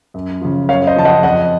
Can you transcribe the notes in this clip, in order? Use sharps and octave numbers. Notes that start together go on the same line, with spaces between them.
F#2
C#3 F3
F#2 C#5 F5
C5 D#5
C#3 F3 A5
D#5 F#5
F2 D#5 F#5